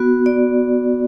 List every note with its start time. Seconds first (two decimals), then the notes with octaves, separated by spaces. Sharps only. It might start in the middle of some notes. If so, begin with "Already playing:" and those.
Already playing: B3 F#4
0.26 D5